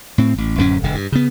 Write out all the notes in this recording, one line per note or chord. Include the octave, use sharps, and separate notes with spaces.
A2 C4
A1
D1 F#2 C#4
E1 D3
G2
C#3 B3